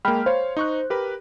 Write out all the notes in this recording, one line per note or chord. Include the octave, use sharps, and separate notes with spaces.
G#3 A#3 G5 B5 F6
C5 C#5 F5
D#4 C#6 F#6
G4 A#4 B4